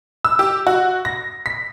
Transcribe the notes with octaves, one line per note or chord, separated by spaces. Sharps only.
E6
G4
F#4
A#6
B6